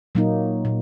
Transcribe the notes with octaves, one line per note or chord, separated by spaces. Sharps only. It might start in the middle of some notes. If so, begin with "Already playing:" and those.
A#2 F#3 A#3 D#4
A#2